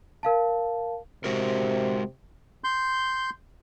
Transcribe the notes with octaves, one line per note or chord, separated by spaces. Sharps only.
A#4 F5 A5
C3 G#3 F#4 A#4
C6 G6